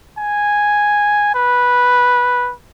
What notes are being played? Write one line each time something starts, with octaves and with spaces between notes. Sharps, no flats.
G#5
B4